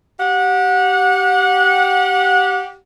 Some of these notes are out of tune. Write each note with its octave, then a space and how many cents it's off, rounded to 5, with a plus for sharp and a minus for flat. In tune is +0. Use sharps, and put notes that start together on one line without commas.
G4 -15 F#5 -25